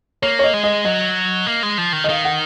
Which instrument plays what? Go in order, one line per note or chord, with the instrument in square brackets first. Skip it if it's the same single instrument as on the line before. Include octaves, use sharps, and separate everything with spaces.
[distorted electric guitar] A#3 [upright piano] C#5
[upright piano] C#5
D#5
[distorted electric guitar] G#3
[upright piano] D#5
[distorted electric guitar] F#3 [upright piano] D#5
[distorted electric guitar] A#3
G#3
F3
D#3
[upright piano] D#5
[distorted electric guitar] D#3 [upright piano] F5
[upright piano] F#5